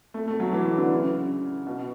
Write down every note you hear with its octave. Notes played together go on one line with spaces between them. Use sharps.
A3
A3
F#3
E3
E3
D3
C#3
B2